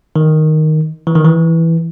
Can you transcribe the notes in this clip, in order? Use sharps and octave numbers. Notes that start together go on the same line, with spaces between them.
D#3
E3
D#3
E3